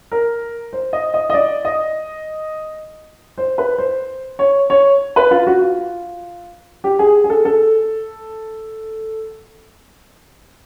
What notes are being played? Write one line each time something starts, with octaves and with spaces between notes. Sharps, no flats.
A#4
C5
D#5
D#5
D#5
D5
D#5
C5
B4
C5
C#5
C#5
B4
F4
F#4
F4
G4
G#4
G#4
A4
A4